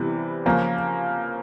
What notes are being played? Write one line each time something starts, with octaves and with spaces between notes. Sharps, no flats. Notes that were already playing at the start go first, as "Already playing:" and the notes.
Already playing: C3 E3 G3 B3
C#3 F3 A#3